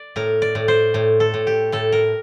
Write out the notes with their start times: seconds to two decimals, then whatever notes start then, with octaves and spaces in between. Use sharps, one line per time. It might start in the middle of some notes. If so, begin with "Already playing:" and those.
Already playing: D5
0.16 A2 A#4
0.42 D5
0.55 A2
0.68 C5
0.94 A2
1.20 A4
1.34 A2
1.47 G4
1.72 A2 A4
1.92 A#4